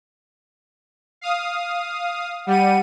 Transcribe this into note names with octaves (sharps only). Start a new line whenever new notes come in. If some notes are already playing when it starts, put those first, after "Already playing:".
F5 D#6
G3 F#5 D#7